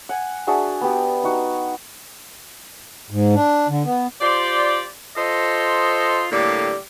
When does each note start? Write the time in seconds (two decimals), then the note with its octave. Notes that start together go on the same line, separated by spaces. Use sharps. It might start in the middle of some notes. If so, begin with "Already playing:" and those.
0.09 F#5 G#5
0.47 D4 F#4 G#4 E5
0.81 B3 G4
1.23 D#4 F#4
3.10 G#2
3.35 D4
3.69 D3
3.85 B3
4.21 F4 G4 C5 D5
5.16 F4 A4 C5 D#5
6.32 A2 D3 G3 A#3 G4